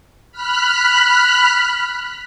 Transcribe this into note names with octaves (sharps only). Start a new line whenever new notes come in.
B5 F6 F#6 B6